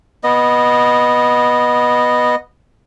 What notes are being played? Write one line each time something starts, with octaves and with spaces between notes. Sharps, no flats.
B3 D#5